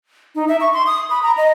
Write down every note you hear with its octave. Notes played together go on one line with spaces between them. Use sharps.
D#4
E5
C#6
C6
D#6
B5
A#5
D#5